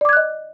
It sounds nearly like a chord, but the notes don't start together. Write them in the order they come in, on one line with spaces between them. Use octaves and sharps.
D5 D6 G#6 F#6 D#5